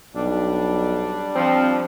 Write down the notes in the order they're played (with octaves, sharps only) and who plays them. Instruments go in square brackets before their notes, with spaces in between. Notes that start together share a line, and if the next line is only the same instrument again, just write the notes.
[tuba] B1 [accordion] G3 D4
[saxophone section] F3 [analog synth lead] C4